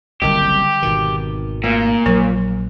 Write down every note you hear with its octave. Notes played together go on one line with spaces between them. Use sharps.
F#1 C2 F#2 D3 G3 G4
G#1 B2 D#3
A#2 A3
A#1 F#3 A#4